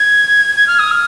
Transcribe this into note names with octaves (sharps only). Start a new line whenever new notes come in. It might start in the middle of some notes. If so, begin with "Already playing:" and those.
Already playing: G#6
G#6
F6
D#6
F6